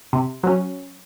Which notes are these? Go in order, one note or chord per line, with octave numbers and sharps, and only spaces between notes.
C3
F#3 C#4